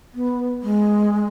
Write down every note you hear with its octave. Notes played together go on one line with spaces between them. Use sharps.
B3
G#3